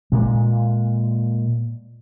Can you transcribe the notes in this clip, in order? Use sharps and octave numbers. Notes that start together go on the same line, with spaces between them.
A#2 G#3